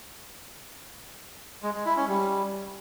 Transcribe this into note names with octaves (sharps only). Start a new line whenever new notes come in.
G#3
G#3
E4
C#4
G3